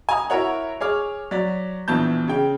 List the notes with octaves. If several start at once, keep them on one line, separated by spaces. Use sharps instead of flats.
G#5 A#5 D#6
E4 F#4 A#4 C#5 F#5
G#4 C#5 D6 F6
F#3 D5 B6
A#1 B2 E3 A5 G6
C#3 G5